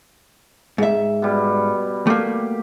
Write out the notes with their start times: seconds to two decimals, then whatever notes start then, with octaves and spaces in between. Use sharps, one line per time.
0.78 G#2 E5
1.22 B2 G3
2.07 A3 A#3 G4